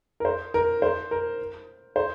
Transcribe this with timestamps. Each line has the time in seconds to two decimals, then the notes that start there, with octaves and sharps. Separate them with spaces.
0.20 A#4
0.25 C5
0.54 A#4
0.82 C5
1.11 A#4
1.96 C5